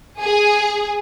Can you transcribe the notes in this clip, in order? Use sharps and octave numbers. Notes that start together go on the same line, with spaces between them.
G#4